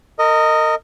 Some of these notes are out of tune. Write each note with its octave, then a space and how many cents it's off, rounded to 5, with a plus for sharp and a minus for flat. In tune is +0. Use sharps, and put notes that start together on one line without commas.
A#4 -30 D#5 +0